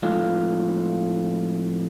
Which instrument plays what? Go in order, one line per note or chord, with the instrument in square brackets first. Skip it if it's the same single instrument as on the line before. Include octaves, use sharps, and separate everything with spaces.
[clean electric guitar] F2 A2 G#3 F4 A4 F5